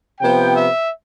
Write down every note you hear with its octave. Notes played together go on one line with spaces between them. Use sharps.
C3 F3 B3 G5
E5